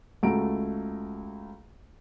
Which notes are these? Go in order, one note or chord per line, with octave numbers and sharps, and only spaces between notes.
C#2 A3 F#4 A#5 D7